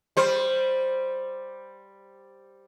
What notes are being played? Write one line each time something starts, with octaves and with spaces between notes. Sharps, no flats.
G3 C5